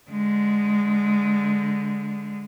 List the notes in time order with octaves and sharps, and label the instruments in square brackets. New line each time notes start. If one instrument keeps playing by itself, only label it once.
[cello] D3 G#3